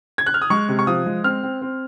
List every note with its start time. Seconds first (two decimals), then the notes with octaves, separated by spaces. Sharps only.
0.18 G#6
0.26 F#6
0.34 F6
0.42 D#6
0.50 G#3 C#6
0.69 C3
0.79 C#6
0.87 F3 D#6
1.06 G#3
1.24 C4 F6
1.43 C4
1.62 C4